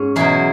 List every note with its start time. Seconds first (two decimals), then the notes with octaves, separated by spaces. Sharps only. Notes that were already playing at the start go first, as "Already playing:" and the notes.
Already playing: G#2 C#4
0.16 E2 B2 F#3 E4 G#4